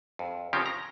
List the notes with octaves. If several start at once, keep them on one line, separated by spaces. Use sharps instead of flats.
F2
C#3 F3 C4 C#4 G4
A#5